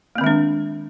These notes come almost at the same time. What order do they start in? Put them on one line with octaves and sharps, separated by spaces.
A#3 C4 D#3 G#3 D4